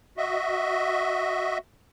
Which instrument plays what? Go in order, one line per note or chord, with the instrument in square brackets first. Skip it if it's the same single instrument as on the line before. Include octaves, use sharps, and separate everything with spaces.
[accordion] F#4 D#5 E5